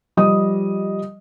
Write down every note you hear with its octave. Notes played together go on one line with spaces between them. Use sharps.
F3 G3 D#5 D#6